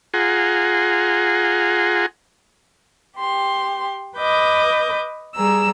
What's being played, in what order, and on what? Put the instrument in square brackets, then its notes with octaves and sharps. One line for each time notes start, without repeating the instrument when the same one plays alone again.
[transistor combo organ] F4 G#4 F#5 G#5 A#5 C6
[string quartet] G4 C6
B4 D#5 D6 G6
G3 G#4 A#5 E6